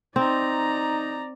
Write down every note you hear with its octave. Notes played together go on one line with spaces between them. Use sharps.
C4 D#4 D5 A#5